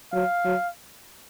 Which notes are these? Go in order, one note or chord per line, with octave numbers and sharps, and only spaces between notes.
F#3 F5
F#3